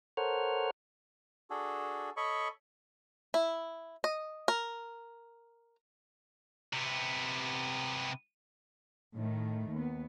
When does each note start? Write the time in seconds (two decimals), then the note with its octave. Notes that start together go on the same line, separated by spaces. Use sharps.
0.17 A4 A#4 C5 C#5 F#5 F6
1.50 D4 F#4 G#4 A4
2.17 A4 C#5 D#5 B5 C#6
3.34 E4
4.04 D#5
4.48 A#4
6.73 C3 B3
9.14 A2 D#3 A3
9.72 D#2 B3